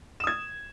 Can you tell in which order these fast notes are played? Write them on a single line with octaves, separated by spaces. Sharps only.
E7 D#6 G#6